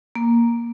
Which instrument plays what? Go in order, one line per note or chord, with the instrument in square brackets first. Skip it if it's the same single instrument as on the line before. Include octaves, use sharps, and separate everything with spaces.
[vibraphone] A#3